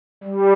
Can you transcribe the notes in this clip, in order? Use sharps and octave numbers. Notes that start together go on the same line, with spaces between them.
G3